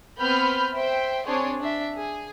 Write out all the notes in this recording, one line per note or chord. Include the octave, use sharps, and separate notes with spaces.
B3 C4 B4 B5 F6 G6
C5 E5 G5
C4 D4 G#4 C5 C#5
D4 E5
G#4